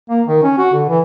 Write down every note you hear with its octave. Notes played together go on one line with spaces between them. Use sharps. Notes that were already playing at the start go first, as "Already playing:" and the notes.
A#3
D#3
C#4
F#4
D3
E3